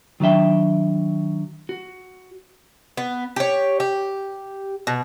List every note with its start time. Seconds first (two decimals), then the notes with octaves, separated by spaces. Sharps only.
0.20 D#3 F#3 D4 E5 G5
1.69 F#4
2.97 B3
3.36 G4 C#5
3.80 G4
4.87 B2